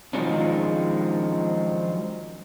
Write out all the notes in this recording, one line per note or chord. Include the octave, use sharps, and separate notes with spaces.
D#3 F3 F#3 G#3 C#4 D4